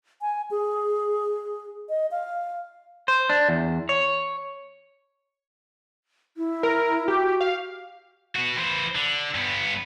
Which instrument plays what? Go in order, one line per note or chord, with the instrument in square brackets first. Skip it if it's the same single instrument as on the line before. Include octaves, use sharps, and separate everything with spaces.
[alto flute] G#5
G#4
D#5
F5
[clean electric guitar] C5
D4
E2
C#5
[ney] E4
[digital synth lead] A#4
[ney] F#4 [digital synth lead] G4
[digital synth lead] F5
[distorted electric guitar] B3 F#4
E3 C5
D3
G2 B3